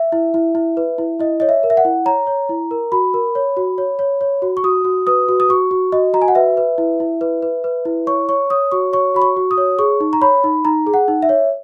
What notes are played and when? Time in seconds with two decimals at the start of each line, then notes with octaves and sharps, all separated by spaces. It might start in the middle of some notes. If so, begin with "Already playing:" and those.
Already playing: E5
0.12 E4
0.34 E4
0.55 E4
0.77 B4
0.98 E4
1.19 E4 D#5
1.40 C#5 D#5
1.49 E5
1.63 A#4
1.70 E5
1.77 F#5
1.85 E4
2.05 C#5 A#5
2.27 C#5
2.49 E4
2.71 A#4
2.92 F#4 B5
3.14 A#4
3.35 C#5
3.57 F#4
3.78 C#5
3.99 C#5
4.21 C#5
4.42 F#4
4.57 C#6
4.64 F#4 D#6
4.85 F#4
5.07 B4 D#6
5.29 F#4
5.40 D#6
5.49 F#4 C#6
5.71 F#4
5.92 F#4 D#5
6.14 F#4 A#5
6.22 G#5
6.28 F#5
6.35 B4 E5
6.57 B4
6.78 E4
7.00 E4
7.21 B4
7.43 B4
7.64 B4
7.85 E4
8.07 C#5 C#6
8.29 C#5 C#6
8.50 C#5 D#6
8.72 F#4 C#6
8.93 C#5 C#6
9.14 F#4 B5
9.22 C#6
9.36 F#4
9.51 D#6
9.58 C#5
9.78 G#4 C#6
10.00 D#4
10.13 A#5
10.22 C#5 B5
10.44 D#4
10.65 D#4 A#5
10.87 G#4
10.94 F#5
11.08 D#4
11.22 E5
11.29 C#5